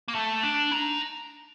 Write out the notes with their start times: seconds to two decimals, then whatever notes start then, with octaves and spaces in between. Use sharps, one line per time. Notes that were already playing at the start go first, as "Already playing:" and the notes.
0.08 A#3
0.15 A3
0.43 D4
0.71 D#4